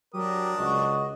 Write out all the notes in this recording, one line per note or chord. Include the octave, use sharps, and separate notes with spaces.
F#3 D4 G4 A#4 D#6
C#2 F#4 D#5